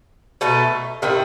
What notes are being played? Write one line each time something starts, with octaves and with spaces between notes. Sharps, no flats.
B2 A3 D#4
C3 D#3 A3 E4